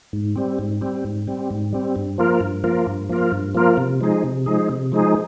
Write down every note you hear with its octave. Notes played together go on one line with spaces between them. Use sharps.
G#2
G3 C4
G#2
G3 C4
G#2
G3 C4
G#2
G3 C4
G2
F3 A#3 F4 A#4
G2
F3 A#3 F4 A#4
G2
F3 A#3 F4 A#4
G2
F3 A#3 F4 A#4
C3
F3 G#3 D#4 G#4
C3
F3 G#3 D#4 G#4
C3
F3 G#3 D#4 G#4